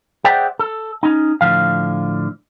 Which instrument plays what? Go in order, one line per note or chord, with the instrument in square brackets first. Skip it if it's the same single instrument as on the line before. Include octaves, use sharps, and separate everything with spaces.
[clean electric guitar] G#4 C5 D5 E5 F#5 G5
A4
C#4 D#4
A2 D3 F3 F5